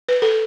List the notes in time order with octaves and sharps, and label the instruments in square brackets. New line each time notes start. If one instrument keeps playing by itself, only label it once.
[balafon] B4
A4